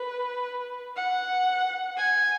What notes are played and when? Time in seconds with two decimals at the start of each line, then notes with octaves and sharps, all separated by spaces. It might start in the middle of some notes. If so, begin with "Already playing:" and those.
Already playing: B4
0.96 F#5
1.97 G#5